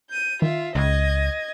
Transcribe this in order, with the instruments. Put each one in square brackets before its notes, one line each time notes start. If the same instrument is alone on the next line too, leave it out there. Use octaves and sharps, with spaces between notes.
[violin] G6 D#7
[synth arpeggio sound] D#3 [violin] F4 E5
[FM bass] C#2 [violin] D#5 G#6